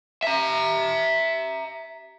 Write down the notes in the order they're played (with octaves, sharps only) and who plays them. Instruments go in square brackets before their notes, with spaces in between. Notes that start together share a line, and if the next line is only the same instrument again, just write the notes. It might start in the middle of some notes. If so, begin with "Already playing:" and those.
[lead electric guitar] E5 A#5